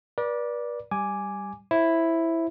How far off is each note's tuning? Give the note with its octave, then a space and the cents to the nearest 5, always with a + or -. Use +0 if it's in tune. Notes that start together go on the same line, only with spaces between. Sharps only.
B4 -40 D5 +0
G3 +0 G#5 +0 D6 +0
E4 +0 C5 +25